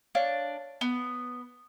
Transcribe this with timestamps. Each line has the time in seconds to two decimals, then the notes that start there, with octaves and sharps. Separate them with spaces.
0.15 D4 C#5 F5
0.81 B3